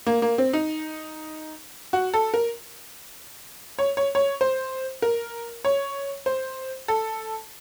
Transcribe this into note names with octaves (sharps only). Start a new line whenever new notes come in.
A#3
A#3
C4
D#4
F#4
A4
A#4
C#5
C#5
C#5
C5
A#4
C#5
C5
A4